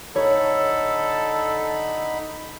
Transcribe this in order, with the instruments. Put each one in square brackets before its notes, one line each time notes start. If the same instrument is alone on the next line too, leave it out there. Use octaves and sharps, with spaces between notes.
[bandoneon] D3 D#4 B5 [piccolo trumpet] A4 [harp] C#5